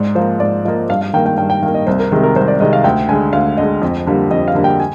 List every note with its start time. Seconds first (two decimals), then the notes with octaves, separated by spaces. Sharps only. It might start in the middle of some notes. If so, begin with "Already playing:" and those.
Already playing: G#2 D5
0.15 F3 A#3 C5
0.40 G#2 D5
0.65 F3 A#3 D#5
0.89 G2 F5
1.01 F5
1.13 D#3 A#3 G5
1.26 G5
1.37 G2 G5
1.50 G5
1.62 D#3 A#3 F5
1.74 D#5
1.87 C2 C5
1.99 A#4
2.12 C3 D#3 G#3
2.23 A#4
2.36 C2 C5
2.48 D5
2.60 C3 D#3 G#3 D#5
2.73 F5
2.84 D2 G5
3.09 D3 G#3 G#5
3.33 D2 F5
3.57 D3 G#3 D#5
3.82 F2
4.07 D3 G3 A#3
4.31 F2 D#5
4.48 F5
4.55 D3 G3 A#3
4.64 G5
4.80 G#5